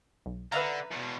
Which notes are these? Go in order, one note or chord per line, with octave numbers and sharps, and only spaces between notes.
B1
D3 B4 E5 F5 A#5
E2 B2